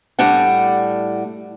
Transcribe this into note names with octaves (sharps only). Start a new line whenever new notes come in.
A2 G3 D4 F#5